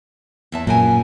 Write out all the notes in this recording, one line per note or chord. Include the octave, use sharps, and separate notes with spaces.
E2 E5 A5
F#2 A#2 A#4 G#5